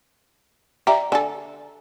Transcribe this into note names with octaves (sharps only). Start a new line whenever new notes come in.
G4 D5 E5 A#5
D3 A4 G#5